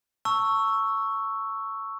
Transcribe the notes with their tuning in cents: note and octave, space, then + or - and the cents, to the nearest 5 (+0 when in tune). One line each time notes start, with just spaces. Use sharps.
A5 +25 C#6 +0 E6 +0